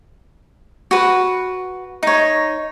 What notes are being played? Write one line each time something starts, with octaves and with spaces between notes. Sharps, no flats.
F#4 B4
D#4 C#5